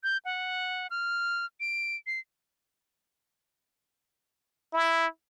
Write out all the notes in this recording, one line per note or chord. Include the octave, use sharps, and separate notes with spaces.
G6
F#5
F6
D7
C7
E4